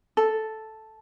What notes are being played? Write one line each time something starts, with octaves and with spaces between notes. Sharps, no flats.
A4